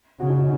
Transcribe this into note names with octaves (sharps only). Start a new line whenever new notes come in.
C#3 F#4
D#4
F#4